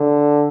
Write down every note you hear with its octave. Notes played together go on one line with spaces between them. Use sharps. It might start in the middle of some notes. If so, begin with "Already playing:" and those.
Already playing: D3